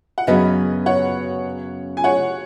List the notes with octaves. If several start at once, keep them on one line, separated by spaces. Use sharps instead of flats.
F#5
F#2 C#3 B3 F#4 B4 D#5
C#5 F#5
G#5
C#5 F#5